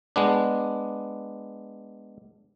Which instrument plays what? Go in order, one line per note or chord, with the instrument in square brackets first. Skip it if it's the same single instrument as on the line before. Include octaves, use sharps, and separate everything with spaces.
[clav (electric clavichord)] G#3 B3 D4